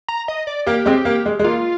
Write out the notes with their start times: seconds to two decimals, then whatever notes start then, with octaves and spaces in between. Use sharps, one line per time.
0.08 A#5
0.28 D#5
0.47 D5
0.66 A#3 G4
0.86 G#3 C4
1.05 A#3
1.26 G#3
1.39 G#3
1.44 A#3 F4